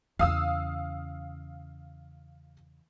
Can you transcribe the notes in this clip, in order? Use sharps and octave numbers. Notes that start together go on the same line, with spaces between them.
E2 C#3 F5 D#6 E6